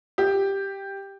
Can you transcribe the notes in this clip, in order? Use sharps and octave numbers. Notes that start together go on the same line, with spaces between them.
G4